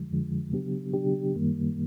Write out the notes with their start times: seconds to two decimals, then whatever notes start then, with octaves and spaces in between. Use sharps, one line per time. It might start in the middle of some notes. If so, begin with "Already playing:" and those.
Already playing: F2 D3 F3 G#3
0.11 F2 D3 F3 G#3
0.52 C#3 F#3 B3 D4 G4
0.94 C#3 F#3 B3 D4 G4
1.35 F#2 D#3 G3 A#3